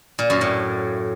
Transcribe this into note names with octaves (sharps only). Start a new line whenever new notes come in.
A#2
F#2
A2